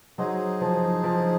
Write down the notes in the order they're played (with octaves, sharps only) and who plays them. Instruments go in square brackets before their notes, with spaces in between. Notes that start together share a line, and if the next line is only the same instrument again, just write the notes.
[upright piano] F#3 [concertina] D#4 G#4 C5 D#5
[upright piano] F3
F3